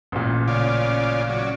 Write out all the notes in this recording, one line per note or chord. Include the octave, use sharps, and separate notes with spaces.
A1 A#2
C#3 F4 D5
F#3 C#4 D5